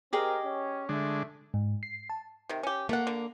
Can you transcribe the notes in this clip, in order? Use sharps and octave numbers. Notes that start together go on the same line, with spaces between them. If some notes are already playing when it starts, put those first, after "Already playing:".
C4 G4 G#4 A#4 D#5
C#4
D3 G#3 A3 D4
G#2
C7
A5
C3 D#3
C#4 G4
A3 A#3 F#5
D3